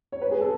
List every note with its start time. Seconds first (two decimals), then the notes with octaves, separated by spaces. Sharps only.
0.12 C#5
0.22 B4
0.31 G#4
0.41 A4